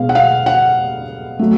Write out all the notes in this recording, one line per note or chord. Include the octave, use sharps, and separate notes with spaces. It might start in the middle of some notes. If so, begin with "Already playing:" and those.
Already playing: B2 G#3 B3 F5
F#5
F5
F#5
F#3 A3